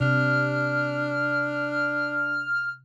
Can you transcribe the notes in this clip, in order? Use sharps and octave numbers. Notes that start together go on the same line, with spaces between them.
C3 D4 F6